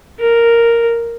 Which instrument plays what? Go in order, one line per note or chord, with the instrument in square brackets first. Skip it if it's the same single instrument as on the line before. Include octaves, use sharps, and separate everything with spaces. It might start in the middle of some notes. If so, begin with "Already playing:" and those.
[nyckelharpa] A#4